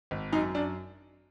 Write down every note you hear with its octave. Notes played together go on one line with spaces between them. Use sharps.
G#1
F#2 D#4
F#2 D4